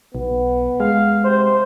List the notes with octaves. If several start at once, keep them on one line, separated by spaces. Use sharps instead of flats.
B1 B3
G#3 F5
C3 C5